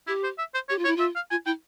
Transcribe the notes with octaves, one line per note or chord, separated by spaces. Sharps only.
E4 G4
C5
E5
C5
G4 C#5
F4
E4 C#5
F4 E5
F5
F4 G#5
E4 G5